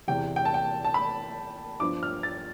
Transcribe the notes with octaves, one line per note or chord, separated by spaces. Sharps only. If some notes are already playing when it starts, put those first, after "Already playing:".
E2 C3 E3 G5
G5
A5
G5
A5
B5
G2 F3 B3 D6
F6
A6